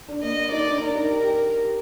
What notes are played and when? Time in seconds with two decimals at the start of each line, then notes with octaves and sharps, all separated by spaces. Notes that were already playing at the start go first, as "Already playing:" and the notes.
0.08 D4
0.23 A#3 D#5
0.52 D#4 D5
0.66 D4
0.80 D4 A#4
0.95 D#4
1.10 G4
1.24 G4